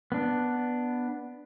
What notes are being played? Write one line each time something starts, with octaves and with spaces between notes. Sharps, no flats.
B3 D4